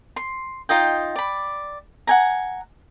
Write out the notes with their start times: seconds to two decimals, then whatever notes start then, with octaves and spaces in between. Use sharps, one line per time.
0.16 C6
0.69 D#4 F4 D#5 G5
1.15 D5 B5
2.07 F#5 G#5 A#5